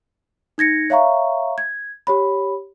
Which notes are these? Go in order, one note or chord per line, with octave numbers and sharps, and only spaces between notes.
D#4 G#6 A#6 C#7
C#5 E5 F5 A#5 C#6
G#6
G4 C#5 B5